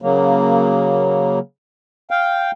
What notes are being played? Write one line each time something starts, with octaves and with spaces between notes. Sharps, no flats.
C#3 F#3 A#3
F5 G5